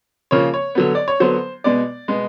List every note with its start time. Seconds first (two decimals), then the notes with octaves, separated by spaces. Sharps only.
0.31 C#3 F3 A#3 C#5
0.54 C#5
0.75 D3 F#3 B3
0.95 D5
1.08 C#5
1.20 D3 F#3 B3 C5
1.64 B2 G#3 B3 D5
2.08 B2 G#3 B3